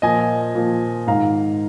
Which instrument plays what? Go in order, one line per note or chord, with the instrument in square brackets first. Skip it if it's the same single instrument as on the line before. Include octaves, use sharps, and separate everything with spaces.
[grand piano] A#2 F3 D#5 G#5
A#2 F3
G#2 D#3 F5 A#5